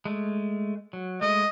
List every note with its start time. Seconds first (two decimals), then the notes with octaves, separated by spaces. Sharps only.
0.05 G#3 A3
0.93 F#3
1.21 G#3 A3 D#5